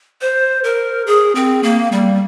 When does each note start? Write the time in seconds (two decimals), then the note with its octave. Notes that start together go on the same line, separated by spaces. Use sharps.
0.21 C5
0.64 A#4
1.07 G#4
1.35 C4
1.63 A#3
1.92 G3